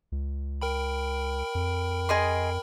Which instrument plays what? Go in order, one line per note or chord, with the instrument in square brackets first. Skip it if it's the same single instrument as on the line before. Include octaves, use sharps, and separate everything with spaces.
[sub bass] C#2
[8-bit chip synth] A#4 G5 B5
[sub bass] F2
[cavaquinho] G#4 D#5 C6